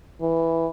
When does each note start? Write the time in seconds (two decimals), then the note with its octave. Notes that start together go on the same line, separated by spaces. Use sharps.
0.21 E3